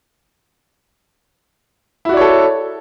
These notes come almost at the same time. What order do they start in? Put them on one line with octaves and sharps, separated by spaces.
E4 F#4 D5 C#5 A4